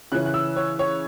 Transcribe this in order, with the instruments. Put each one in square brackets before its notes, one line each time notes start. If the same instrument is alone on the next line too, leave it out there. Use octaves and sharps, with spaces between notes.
[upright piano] C#3 E3 C#4 F#6
F#6
E6
C#5
C#5